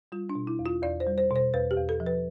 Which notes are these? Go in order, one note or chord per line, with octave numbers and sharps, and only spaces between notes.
G3 F4
D4
B2
E4
E2
F4
E2 D5
C5
G3
C5
B2
C5
E2 B4
G4
E2
A4
F3
B4